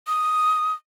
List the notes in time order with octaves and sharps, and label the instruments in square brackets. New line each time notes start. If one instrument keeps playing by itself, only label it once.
[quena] D#6